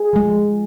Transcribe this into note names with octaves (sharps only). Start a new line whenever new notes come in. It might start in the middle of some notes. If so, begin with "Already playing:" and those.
Already playing: G#4
F3 G#3